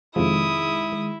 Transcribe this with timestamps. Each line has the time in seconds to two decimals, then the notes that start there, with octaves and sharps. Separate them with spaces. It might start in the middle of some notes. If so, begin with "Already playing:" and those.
0.16 F2 C3 D#3 F3 G#3 E4 D#6